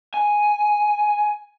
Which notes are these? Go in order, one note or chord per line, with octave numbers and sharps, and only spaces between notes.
G#5